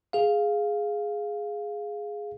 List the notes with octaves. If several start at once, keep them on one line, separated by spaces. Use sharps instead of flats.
G#4 F5